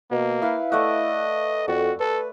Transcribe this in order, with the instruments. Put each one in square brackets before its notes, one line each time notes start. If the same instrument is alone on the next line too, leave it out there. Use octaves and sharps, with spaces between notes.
[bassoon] B2 [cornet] A#3
[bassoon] E4 [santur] B4 F5
[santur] A3 D5 F#5 [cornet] D#5
[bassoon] F2 [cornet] F#4 [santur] D5
[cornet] A4 [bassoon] B4